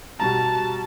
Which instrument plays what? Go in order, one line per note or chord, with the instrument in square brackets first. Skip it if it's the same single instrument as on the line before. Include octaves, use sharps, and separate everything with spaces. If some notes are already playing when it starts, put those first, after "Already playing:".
[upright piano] B2 G3 A#5 [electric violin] A5